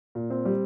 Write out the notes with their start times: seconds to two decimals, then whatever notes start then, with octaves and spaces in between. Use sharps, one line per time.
0.15 A#2
0.30 C4
0.45 G3